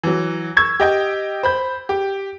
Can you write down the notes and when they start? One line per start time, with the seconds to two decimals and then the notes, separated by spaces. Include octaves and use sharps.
0.03 E3 F#3
0.57 C#6 E6 G#6
0.80 G4 D#5 G5
1.43 C5 B5 G6
1.89 G4